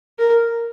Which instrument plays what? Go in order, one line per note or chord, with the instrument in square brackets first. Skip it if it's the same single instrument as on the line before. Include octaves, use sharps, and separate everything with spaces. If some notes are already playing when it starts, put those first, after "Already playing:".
[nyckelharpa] A#4